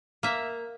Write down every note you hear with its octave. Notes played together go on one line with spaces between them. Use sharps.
A#3 E5